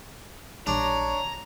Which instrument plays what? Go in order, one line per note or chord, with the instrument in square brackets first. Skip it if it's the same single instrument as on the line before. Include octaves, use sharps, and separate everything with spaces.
[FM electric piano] A#1 G3 [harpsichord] D4 [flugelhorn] C#5 [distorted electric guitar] A#5